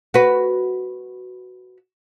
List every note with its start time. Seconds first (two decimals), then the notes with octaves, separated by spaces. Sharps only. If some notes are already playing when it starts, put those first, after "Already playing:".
0.14 F#4 B4